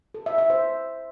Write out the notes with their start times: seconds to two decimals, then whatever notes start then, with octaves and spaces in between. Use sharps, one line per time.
0.14 A4
0.26 E5
0.38 E5
0.50 C5